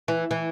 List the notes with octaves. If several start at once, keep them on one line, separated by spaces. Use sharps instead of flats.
E3
E3